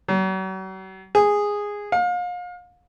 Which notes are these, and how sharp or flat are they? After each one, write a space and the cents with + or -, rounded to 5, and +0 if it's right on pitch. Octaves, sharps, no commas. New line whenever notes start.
F#3 +40
G#4 -10
F5 +35